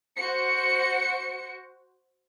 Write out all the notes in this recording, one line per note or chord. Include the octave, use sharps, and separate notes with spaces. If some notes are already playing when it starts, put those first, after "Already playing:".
F#4 C5 C#7